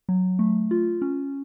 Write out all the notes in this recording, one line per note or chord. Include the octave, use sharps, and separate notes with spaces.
F#3
A3
F4
C#4